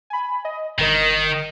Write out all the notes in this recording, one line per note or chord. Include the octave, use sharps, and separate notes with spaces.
G#5 B5
D#5
G1 D#3 A#4 D#5